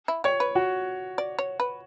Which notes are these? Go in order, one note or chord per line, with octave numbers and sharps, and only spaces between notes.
E4
G4 C#5
B4
F#4
D5
C#5
B4